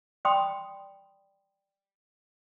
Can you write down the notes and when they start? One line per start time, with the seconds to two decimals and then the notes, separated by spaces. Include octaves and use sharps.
0.25 D5 G5 B5 C6 D#6